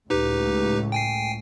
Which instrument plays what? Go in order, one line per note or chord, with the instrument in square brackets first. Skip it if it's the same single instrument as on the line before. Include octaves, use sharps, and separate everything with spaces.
[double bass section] C#2 A2 [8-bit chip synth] D#4 G4 B4
[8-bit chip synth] G5 G#5 C7